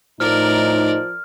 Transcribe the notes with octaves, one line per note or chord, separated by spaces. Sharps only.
A2 F3 D#4 A#4 D5 F6